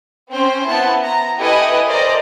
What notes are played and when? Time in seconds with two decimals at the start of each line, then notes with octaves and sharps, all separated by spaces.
0.31 C4 C#4 C5 G5
0.67 B3 E4 A5
1.02 A#5
1.38 E4 G4 A4 B4 D#5 G#5
1.87 A#4 C5 D5 D#5 A#5